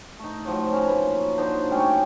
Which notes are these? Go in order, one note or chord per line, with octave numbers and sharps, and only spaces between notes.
A3 D#4
A2 F3 F#3
C#4 C5 A#5
A#3 B4
D3 D4 D#4 C5
F#3 A3 C#4 G5